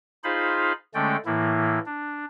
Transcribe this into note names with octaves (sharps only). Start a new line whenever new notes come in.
D#4 F4 G#4 C5 F5 B5
D3 G#3 A3 C#4 D5 G5
A2 E3 A#3 E4
D4